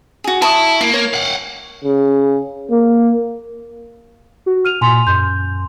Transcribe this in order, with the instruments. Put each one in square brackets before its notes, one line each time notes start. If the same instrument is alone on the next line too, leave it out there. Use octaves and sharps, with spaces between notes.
[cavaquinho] F#4 G#4
[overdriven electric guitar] E4 [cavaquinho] A5 C#6 D#6
[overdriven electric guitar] A#3 [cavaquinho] E4
[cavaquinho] C#5
[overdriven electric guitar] F5 F#5
[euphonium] C#3
A#3
[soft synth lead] F#4
[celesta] F6 D#7 F7
[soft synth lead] A#2 [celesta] G#5 C6 F7
[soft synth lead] F#2 [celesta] C6 G6